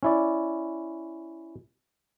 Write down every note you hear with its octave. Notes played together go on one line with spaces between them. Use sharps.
C#4 E4 D5